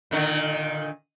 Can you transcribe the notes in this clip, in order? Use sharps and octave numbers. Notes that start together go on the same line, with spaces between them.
A#2 D3 D#3